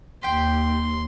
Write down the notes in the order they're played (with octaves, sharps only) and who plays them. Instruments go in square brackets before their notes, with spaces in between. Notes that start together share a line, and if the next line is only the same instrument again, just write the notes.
[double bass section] D#2 [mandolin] G4 G5 [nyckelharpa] C6